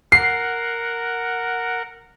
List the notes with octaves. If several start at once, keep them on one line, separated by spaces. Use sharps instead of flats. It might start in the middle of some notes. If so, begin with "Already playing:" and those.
A#4 F#5 C7